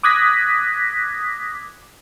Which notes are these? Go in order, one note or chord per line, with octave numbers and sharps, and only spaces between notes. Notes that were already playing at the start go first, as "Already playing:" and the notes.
D6 D#6 F#6 G#6 A#6 B6